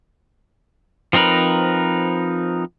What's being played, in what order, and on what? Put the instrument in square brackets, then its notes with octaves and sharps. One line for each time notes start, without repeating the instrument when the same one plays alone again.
[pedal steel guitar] F3 C4 D#4 A#4 B4